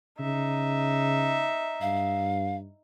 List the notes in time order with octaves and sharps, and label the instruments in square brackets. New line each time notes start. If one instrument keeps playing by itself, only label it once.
[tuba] C#3 [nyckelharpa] D#4 E5
[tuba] G2 [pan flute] F5